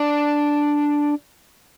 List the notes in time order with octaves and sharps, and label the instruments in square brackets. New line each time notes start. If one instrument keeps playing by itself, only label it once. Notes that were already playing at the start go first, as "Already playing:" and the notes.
Already playing: [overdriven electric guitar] D4